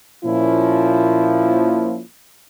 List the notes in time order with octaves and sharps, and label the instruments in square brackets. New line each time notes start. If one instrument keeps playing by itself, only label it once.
[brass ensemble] A#2 F3 C#4 E4